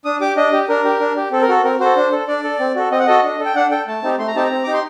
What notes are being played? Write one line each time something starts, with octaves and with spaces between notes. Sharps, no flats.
D4 D#6
G4 D6
D4 D#5
G4
D4 A#4
G4
D4
G4
C4 A4
A#4
F#4 A4
C4 A#4
F#4 A4 C5
D4
A4
D4 D5
A4
C4
F#4 A4
C4 D#5
F#5
F#4 A4 D#5
D4
A4
G5
D4 F#5
A4 G5
A3 A5
C4 D#4 G4
A3 C6
A#5
C4 D#4 G4 A5
A#5
C4
D#4 G4 D6
C6